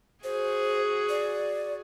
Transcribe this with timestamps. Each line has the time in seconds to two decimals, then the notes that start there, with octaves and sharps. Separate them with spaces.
0.24 F#4 G#4 C5
1.09 D5